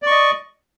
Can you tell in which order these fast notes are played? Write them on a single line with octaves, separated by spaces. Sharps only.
D5 C#6 D#5